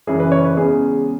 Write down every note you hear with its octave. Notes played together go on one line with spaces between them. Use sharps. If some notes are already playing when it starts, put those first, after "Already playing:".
F#2 C#3 E3 G#4
B4
C#5
B4
E2 C#3 G#3 C#4 G#4